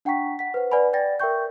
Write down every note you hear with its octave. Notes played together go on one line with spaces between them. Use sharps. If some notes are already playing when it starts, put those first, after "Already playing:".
D4 F#5 G5 A#5 C#6 B6
F#5 B6
B4 C5 F#5
B4 D5 F#5 G#5 B5
D5 G5 A6 A#6
A#4 E5 G5 C#6 G6